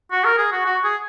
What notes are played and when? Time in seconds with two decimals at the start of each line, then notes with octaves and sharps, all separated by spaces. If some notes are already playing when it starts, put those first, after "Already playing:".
0.12 F#4
0.25 A#4
0.38 G#4
0.52 F#4
0.65 F#4
0.84 G#4